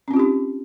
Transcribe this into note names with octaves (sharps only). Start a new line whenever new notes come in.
C4 C#4 D#4 F4 G4